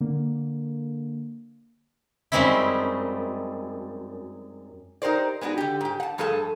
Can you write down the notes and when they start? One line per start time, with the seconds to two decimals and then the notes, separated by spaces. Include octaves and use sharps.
0.01 D3 A#3
2.32 F#2 G3 G#3 C4 D#4 E4
5.02 D#4 G4 A#4 C5 D5
5.41 G#3 B3 D4 D#4 F#4
5.58 D3 G4
5.81 G#2 G4
6.00 F#5 A5
6.18 G2 F3 A3 G#4 A4 A5